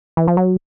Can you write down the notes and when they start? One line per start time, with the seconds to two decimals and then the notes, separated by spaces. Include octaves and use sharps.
0.17 E3
0.28 F3
0.37 F#3